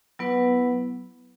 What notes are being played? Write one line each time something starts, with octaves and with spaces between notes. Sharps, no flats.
F#3 B3 E4 B4 F#5